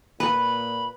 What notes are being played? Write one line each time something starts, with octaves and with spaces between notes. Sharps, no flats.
A#2 B4 B5